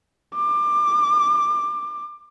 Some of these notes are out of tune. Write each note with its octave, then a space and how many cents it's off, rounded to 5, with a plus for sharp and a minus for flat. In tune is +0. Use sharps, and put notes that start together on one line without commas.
D6 +25